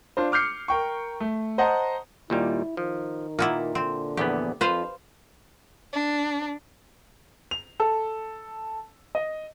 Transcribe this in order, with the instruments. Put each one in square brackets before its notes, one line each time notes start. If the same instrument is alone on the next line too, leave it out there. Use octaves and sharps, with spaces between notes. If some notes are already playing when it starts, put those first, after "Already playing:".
[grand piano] D4 F4 C5
D6 F6 G6 C7 C#7
A#4 G5 C#6
A3
C5 D#5 F#5 A5 A#5
[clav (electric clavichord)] D#2 A#2 G3 [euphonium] E4
[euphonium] D#3 [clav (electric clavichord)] F3
[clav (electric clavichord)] A#2 [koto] A#3 B3 E4
[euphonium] D3 [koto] C4
[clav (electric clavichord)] A#1 E2 B3 [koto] G4
[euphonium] F2 [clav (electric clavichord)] F4 [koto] B4 C5 F5
[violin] D4
[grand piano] F7
A4
D#5